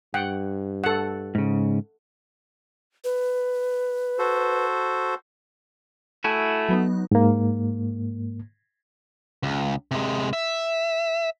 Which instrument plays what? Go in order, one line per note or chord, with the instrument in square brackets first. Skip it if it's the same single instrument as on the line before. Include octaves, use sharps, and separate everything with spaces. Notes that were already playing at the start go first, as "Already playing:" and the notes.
[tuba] G2 [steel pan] F#5 G5
[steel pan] A4 F#5
[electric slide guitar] G#2 C#3
[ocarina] B4
[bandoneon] F#4 A4 C5
[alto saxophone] A3 [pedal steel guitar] E4 F#4 G#5
[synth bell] F#3 B3 D#4
[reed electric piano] G#2 A#3
[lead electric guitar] C#2
C3 G#3
E5